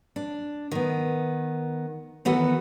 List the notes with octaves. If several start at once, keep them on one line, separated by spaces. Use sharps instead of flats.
D4
D#3 B3
D#3 E3 B3 F#4 A4